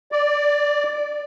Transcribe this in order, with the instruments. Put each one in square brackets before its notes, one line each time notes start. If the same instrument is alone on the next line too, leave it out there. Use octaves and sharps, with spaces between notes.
[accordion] D5